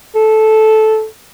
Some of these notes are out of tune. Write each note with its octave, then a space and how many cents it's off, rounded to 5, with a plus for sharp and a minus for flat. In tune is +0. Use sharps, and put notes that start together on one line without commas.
A4 -10